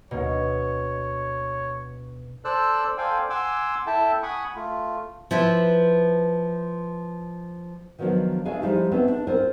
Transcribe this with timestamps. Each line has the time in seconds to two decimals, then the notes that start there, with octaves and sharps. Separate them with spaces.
0.11 D2 B2 A#3 C#5 D#5
2.45 A4 C5 D5 E6 F#6
2.98 A4 C5 D5 F5 G5 G#5
3.30 F#5 G#5 C6 D6 E6
3.87 E4 A4 E5 G5 A5
4.23 F#5 G#5 B5 C#6 D#6
4.56 A3 F4
5.31 F3 E4 B4
7.99 D#3 F3 F#3 B3 D4 F4
8.45 C#3 A3 D4 G#4 F5 G#5
8.62 F3 G3 G#3 D#4 E4 G4
8.91 A3 B3 C4 D4 G#4
9.08 D4
9.27 C4 F4 G#4 A#4 C5